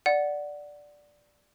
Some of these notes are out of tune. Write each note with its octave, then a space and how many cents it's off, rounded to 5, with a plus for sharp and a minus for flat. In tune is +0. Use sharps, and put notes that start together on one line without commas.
D5 +0 F#5 +0